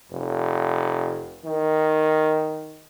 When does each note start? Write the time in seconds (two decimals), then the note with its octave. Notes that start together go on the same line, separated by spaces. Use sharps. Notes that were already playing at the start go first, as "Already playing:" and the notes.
0.11 F1
1.45 D#3